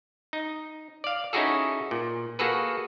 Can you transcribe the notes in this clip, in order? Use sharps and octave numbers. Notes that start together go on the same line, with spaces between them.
D#4
D5 F5
C#4 D#4 E4 F#4 G#4 A4
A#2
A#3 F#4 G#4 A4 B4